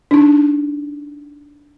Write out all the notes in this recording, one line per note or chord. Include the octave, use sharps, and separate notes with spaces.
D4 D#4